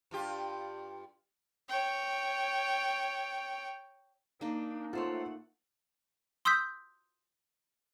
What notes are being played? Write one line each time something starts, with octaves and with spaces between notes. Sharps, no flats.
G2 F4 G4
C#5 G5
A#3 D4 D#4
A3 F4 A4 C5 C#5 F#5
C6 D#6 E6 G6 B6